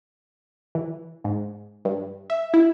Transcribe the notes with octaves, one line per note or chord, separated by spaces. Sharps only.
E3
G#2
G2
E5
E4